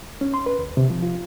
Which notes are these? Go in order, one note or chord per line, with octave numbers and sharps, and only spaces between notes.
C#4
C6
B4
D#2
C3
F3
F4